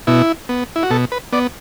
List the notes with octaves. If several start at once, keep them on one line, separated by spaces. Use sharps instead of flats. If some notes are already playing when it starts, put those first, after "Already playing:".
B2 E4
B3
E4
F#4
B2 A4
B4
B3 D5